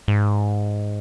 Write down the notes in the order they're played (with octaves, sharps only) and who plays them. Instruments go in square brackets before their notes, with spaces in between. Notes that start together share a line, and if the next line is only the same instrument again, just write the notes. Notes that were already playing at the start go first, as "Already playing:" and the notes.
[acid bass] G#2